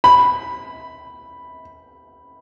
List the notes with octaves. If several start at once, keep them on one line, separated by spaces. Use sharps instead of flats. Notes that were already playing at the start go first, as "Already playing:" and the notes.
B5